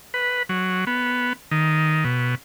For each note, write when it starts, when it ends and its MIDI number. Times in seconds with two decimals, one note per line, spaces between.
0.14 0.43 71
0.49 0.85 54
0.87 1.33 59
1.51 2.04 51
2.05 2.35 47